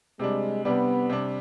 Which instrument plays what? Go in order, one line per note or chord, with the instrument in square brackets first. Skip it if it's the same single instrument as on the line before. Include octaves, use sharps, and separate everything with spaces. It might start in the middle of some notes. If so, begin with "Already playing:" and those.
[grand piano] C3 G3 D4 [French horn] G#3
[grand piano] C3 G3 D4 [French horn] B3
[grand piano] C3 G3 D4